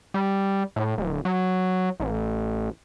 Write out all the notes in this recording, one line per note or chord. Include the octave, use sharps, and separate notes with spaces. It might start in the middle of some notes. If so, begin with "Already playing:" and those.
G3
A2
D1
F#3
A1